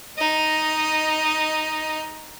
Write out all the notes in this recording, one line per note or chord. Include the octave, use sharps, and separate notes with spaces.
D#4 D#5